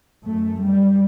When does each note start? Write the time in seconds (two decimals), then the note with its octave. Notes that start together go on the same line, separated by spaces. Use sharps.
0.23 F#2 A3
0.62 G3